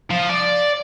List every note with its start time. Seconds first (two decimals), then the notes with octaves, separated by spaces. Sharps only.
0.11 F3
0.29 D5